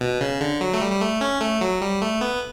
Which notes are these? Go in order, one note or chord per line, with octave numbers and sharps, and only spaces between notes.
B2
C#3
D3
F#3
A3
G3
G3
A3
C#4
A3
F#3
G3
A3
B3